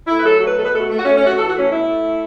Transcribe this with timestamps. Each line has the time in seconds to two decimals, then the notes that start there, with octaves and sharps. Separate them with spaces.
0.07 A3 E4
0.20 B4
0.24 F#3 A4
0.39 A3 F#4
0.48 B4
0.57 B2 A4
0.64 B4
0.72 A3 A4
0.80 F#4
0.89 A3
0.97 F#4
1.05 A3 C#4
1.17 A3 C#4
1.26 F#4
1.38 E3 A4
1.48 F#4
1.54 A3
1.59 C#4
1.70 B2 E4
1.87 A3
2.02 A3